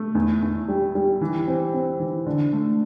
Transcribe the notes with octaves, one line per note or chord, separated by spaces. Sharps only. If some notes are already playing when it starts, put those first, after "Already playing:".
Already playing: A3
E2
E2
G3
G3
E3
C4
C4
E3
D3
A3